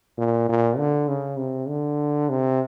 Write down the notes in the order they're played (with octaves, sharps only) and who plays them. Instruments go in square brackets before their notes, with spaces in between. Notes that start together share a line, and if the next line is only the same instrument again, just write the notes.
[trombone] A#2
A#2
D3
C#3
C3
D3
C3